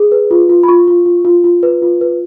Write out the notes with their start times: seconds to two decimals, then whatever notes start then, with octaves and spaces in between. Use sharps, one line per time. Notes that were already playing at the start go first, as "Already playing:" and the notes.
Already playing: G#4
0.12 B4
0.31 F4
0.49 F4
0.63 B5
0.68 F4 C#6
0.88 F4
1.06 F4
1.25 F4
1.44 F4
1.63 B4
1.82 F4
2.01 B4